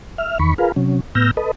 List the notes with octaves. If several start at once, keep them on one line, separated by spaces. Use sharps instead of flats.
E5 F6
E2 D#3 B5 C#6
F4 G#4 A#4 B4 F5
C3 F#3 C#4
A2 B3 E6 F6 G6 A#6
A4 B4 D#5